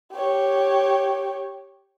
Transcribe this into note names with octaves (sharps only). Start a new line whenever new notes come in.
G4 C#5